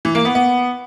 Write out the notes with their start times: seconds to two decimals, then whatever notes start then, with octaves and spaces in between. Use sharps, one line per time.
0.05 E3
0.15 A#3
0.25 B3
0.35 B3